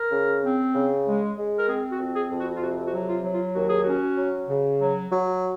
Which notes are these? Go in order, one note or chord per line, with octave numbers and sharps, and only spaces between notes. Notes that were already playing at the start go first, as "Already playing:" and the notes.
Already playing: A#4
C#3
C4
C#3
G#3
G#3
A#4
C4 G#4
F#4
F2
G#4
F2
F#4
F4
C3 F#4
F#4
F#3
F4
F#3
F4
D#2 F#4
G#4
C#4 F#4
F#3
C#3
F#3
F#3